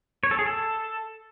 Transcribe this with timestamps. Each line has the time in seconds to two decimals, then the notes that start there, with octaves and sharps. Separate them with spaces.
0.23 C#5
0.31 A4
0.39 G#4
0.46 A4